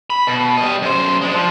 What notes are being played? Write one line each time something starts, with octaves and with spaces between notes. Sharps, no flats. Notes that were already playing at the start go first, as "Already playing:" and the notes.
B5
B2
G3 D#5
F#2 C5
G#3 D4
F3